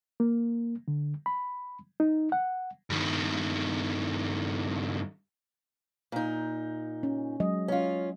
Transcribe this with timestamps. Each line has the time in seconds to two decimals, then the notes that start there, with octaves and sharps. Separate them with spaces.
0.20 A#3
0.88 D3
1.26 B5
2.00 D#4
2.32 F#5
2.90 G2 D#3
6.12 A#2 D#4
7.03 C#4
7.40 F#3 G#3 D#5
7.68 C#4 F4